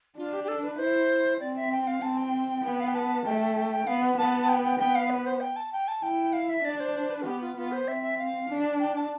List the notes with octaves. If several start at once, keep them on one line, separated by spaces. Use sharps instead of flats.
D4 F4
G4
G4
A4
B4
E4 C5
C4 D5
E5
G5
F5
C4 A5
G5
B3
F5
G5
A5
A3 G5
G5
G5
G5
B3 F5
B3 A5
G5
G5
B3 G5
F5
B4
C5
G5
A5
G5
A5
E4 G5
F5
E5
D4 D5
C5
C5
B4
F4
B3 G4
F4
B3 F4
C5
C4 E5
E5
F5
D4
G5
A5